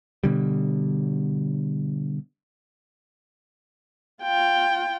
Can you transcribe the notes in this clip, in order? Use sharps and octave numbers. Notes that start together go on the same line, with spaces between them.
B2 D3 G3
F4 G5